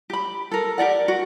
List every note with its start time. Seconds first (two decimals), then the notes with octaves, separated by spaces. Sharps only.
0.10 G4 B5
0.51 A4 A#4
0.78 G4 A#4 D5 F#5
1.08 F#4